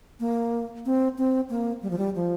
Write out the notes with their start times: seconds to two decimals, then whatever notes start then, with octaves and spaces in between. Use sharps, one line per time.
0.20 A#3
0.86 C4
1.18 C4
1.50 A#3
1.82 G3
1.90 F3
1.98 G3
2.15 F3